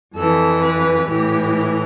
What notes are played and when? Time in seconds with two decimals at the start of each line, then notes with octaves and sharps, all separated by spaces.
0.16 F2 E3 A4
0.63 B4
1.09 A2 E3 G4